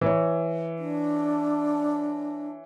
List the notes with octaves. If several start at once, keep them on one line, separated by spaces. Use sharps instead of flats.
E3 C#5
D4